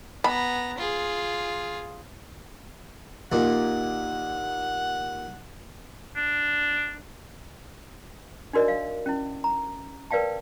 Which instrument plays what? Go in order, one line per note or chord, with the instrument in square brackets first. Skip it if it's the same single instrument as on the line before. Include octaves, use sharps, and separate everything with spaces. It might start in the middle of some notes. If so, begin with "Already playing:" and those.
[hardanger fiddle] B3 A#5 [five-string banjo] B5
[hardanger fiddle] F4 G#4
[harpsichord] D#2 A#2 [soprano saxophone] F#5
[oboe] D4
[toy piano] D4 D#4 F#4 A#4 D5 D#5
F5
C#4 E4
A#5
A#4 B4 D5 F5 G5 A5